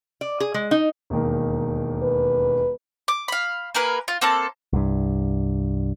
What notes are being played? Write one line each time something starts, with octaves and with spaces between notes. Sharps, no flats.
D5
G#4
G#3
D#4
E1 D#2 D#3
B4
D6
F5 B5
A#3 G#4 A#4 B4
F4
A#3 C4 A4 A5
C2 G2